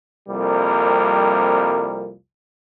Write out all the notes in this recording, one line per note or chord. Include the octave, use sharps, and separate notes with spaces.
C2 F2 G3 A#3